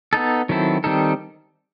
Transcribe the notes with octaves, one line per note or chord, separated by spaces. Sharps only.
B3 D#4 A4
D#3 F#3 C4 E4 A4
D#3 G3 C4 D#4 A4